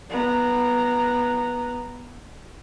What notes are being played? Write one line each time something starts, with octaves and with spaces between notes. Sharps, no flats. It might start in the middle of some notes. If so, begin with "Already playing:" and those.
B3 A#5